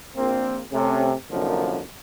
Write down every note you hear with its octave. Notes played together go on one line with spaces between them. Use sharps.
A#1 A#3 C4
C3 A3 C#4
C2 F#2 D3 F3 A#3 D#4